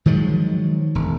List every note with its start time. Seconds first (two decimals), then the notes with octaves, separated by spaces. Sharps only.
0.06 D#3 F3 F#3 G#3
0.95 E1